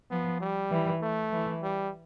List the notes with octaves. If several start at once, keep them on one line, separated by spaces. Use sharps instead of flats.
F3 B3
G3
E3
A3
E3
G3